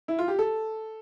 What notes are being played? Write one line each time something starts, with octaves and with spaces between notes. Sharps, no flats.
E4
F4
G4
A4